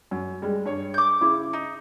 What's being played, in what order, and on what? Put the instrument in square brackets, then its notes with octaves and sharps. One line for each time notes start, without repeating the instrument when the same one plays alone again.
[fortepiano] F#2
G3 G#3
G2 C#5
[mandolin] D6 G6
[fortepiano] C#3 E4
[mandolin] D#4